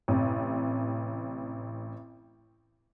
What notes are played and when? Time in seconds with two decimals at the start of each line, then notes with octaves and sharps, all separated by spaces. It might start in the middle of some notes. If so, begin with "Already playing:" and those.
0.08 A1 C3